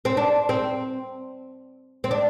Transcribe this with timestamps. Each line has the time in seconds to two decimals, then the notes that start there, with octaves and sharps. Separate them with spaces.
0.05 C4
0.17 D4
0.49 C4
2.04 C4
2.11 D4